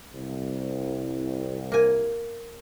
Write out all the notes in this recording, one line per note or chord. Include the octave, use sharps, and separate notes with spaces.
C2
A#3 G#5